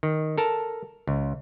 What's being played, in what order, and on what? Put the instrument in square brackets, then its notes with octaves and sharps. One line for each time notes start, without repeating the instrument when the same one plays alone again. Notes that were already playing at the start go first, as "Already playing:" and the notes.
[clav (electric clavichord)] D#3
A4 A#4 A5
C#2